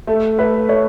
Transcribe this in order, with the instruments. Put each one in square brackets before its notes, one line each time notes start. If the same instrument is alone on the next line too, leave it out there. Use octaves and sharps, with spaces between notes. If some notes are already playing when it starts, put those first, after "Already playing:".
[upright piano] A3 [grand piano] A4
[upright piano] A3 [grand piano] B4
[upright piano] A3 [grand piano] C#5